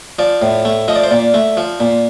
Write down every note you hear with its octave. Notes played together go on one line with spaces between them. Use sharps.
F3 D5
A2
A3
F3 D#5
D5
C5
A#2 D5
A3
F3
A#2